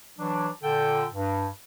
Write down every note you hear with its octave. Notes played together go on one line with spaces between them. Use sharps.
E3 F#3 D4
A#2 D3 A4 G5
G2